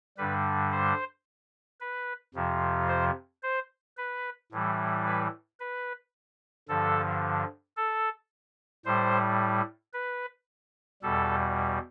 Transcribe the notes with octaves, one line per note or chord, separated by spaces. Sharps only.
G2 D3 G3 B4
C5
B4
F2 C3 F3
C5
C5
B4
A2 E3 G3
B4
B4
G2 D3 F3 A4
A4
A2 G3 C5
B4
E2 B2 G3 A4